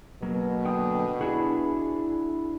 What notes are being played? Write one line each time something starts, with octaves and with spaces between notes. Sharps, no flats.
B2 F#3 A#3
D3 G5 D#6
D4 E4 F#4 G#4